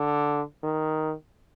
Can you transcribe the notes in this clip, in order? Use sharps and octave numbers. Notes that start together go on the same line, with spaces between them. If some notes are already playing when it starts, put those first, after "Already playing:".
Already playing: D3
D#3